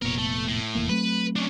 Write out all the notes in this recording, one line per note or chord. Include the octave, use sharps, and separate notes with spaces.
F1 A#2 B3 A#4 C#5
A3
A2
F1 E2 A#3
F#3 A3 C4 B4
C#4 D4